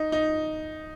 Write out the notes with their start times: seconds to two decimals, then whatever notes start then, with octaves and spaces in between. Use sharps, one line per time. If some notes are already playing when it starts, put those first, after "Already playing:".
Already playing: D#4
0.12 D#4